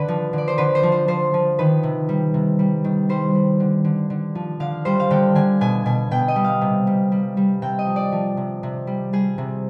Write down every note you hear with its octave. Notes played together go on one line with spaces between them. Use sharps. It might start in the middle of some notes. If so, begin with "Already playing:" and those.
Already playing: D3 B4 D5
F3
D3 D5
C5
D3 B4
C5
F3
C5
F3 C5
F3
D#3 B4
C3
G3
C3
G3
D#3
G3 C5
G3
D3
D3
D3
F3
D3 F5
G3 C5
F5
D3 G5
D3 G#5
B2 G#5
B2 G#5
B2 G5
D#5
G3
F5
C3
G3
G3
G3
C3 G5
D#5
F3
D5
F3
C3
C3
G3
G3 G#4
C3